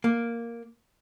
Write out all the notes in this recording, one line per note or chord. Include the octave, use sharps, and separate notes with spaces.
A#3